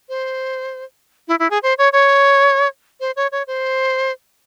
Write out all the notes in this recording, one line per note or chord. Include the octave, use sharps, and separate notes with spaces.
C5
E4
E4
G#4
C5
C#5
C#5
C5
C#5
C#5
C5